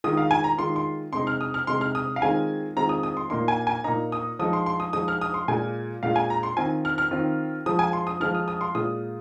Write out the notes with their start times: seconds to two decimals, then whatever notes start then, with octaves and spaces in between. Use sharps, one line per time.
0.04 D#3 G#3 F4 D#6
0.17 F5
0.31 G#5
0.44 A#5
0.58 D#3 G#3 F4 C6
0.76 C6
1.13 C3 G#3 D#4 C6
1.27 F6
1.41 D#6
1.54 F6
1.67 C3 G#3 D#4 C6
1.81 F6
1.95 D#6
2.16 F5
2.22 D#3 G#3 C4 F4 G#5
2.76 D#3 G#3 C4 F4 A#5
2.89 D#6
3.03 D#6
3.17 C6
3.30 A#2 A#3 D#4 C6
3.48 G#5
3.67 G#5
3.84 A#2 A#3 D#4 A#5
4.12 D#6
4.39 F3 G#3 D#4 D#6
4.53 C6
4.66 C6
4.80 D#6
4.93 F3 G#3 D#4 D#6
5.08 F6
5.22 D#6
5.34 C6
5.48 A#2 G#3 F4 G#5
6.03 A#2 G#3 F4 F5
6.16 G#5
6.30 A#5
6.43 C6
6.57 D#3 C4 F4 G#5
6.85 F6
6.98 F6
7.11 D#3 C4 F4
7.66 F3 G#3 F4 D#6
7.79 G#5
7.93 C6
8.07 D#6
8.20 F3 G#3 F4 F6
8.35 D#6
8.48 D#6
8.61 C6
8.75 A#2 G#3 F4 D#6